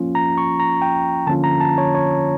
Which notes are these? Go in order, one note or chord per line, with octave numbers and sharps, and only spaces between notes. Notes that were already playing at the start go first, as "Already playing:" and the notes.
Already playing: F3 A#3 C#4 F4
A#5
C#6
A#5
G5
D3 F3 A#3 C#4 F4 A5
A#5
A5
C#5
C#5